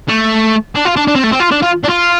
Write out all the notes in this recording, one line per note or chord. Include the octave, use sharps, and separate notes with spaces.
A3
D4
F4
D4
D4
C4
A3
C4
F4
D4
F4
D4
F4